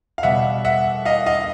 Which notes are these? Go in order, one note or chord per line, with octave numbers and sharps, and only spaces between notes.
F5
B2 G3 B3 E5 F#5
E5 F#5
D#5 F5
D#5 F5